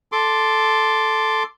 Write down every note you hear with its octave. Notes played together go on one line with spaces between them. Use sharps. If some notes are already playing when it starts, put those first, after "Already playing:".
A4 C6 D6